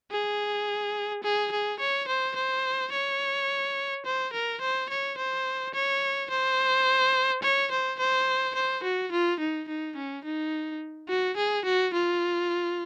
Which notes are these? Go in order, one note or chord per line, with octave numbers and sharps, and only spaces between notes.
G#4
G#4
G#4
C#5
C5
C5
C#5
C5
A#4
C5
C#5
C5
C#5
C5
C#5
C5
C5
C5
F#4
F4
D#4
D#4
C#4
D#4
F#4
G#4
F#4
F4